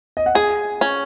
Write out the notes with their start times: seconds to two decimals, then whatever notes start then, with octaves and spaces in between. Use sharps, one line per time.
0.17 D#5
0.26 F#5
0.35 G#4 G#5
0.81 C#4